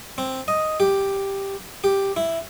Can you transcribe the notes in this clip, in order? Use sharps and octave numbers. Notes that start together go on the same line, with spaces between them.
C4
D#5
G4
G4
E4